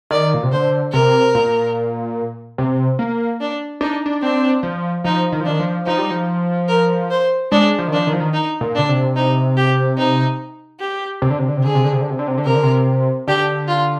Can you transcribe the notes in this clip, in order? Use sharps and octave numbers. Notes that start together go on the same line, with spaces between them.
D#3 D5
A#2
C3
D3 C5
C3 A#4
A#2
C3
A#3
D4
D4 D#4
D4
C4 D4
F3
F3 D#4
D#3
F3
D#3 D4
F3
F3 D#4
G3
F3
A#4
C5
G#3 D4
F3
D#3
F3 D4
D#3
F3
D#3
D#4
A#2
D3 D4
C3
D#4
G4
D#4
G4
C3
D3
C3
D3
C3
D3 G#4
C3
D3
C3
D3
C3
D3
C3
D3
C3 A#4
D3
C3
D3 G4
F4